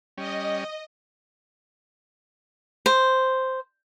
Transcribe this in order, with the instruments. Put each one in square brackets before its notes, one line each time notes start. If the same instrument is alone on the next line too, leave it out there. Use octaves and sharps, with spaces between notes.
[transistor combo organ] G3 C#4 [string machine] D#5
[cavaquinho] C5